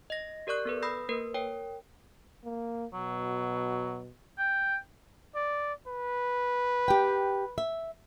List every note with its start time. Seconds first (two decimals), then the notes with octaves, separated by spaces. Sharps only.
0.10 D#5 A#6
0.47 G4 A#4 D5 C#6 F#6
0.65 B3 A4 B4
0.82 B5 D#6 E6 G6 A#6 C7
1.09 A#3 A#4 B4
1.34 A#4 C#5 G5
2.45 A#3
2.93 B2 F#3
4.38 G5
5.35 D5
5.87 B4
6.88 G4 G5
7.58 E5